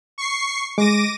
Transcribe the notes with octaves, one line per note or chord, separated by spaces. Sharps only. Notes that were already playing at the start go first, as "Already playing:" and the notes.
C#6 C7
G#3 D6 A#6 D#7